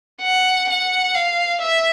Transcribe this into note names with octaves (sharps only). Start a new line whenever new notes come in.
F#5
F#5
F5
E5